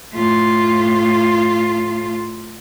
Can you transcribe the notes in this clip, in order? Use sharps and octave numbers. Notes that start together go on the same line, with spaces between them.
A2 F4